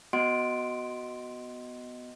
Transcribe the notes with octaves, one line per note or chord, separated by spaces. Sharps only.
B3 F#4 D#5 F#5 C6 D7